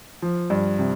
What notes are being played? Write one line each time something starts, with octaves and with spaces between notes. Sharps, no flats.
F3
G2
C3